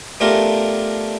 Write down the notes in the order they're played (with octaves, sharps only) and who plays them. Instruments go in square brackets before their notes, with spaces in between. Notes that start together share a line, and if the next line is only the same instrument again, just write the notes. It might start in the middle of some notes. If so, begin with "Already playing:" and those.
[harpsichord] A3 B3 D4 F4 G4 A#4